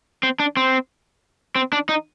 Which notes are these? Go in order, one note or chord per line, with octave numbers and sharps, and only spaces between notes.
C4
D4
C4
C4
D4
D#4